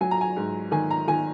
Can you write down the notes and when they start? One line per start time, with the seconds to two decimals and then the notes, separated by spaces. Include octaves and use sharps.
0.01 F#3 G#5
0.11 A#5
0.21 G#5
0.36 G#2
0.71 D#3 G#5
0.91 A#5
1.08 D#3 G#5